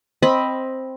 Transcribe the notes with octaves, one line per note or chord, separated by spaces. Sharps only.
C4 D#5 B5